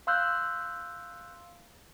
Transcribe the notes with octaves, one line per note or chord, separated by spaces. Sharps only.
F5 C6 E6 F#6 G6